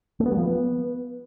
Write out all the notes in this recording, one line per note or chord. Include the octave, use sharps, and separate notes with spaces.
A3
B3
G3
F3
B3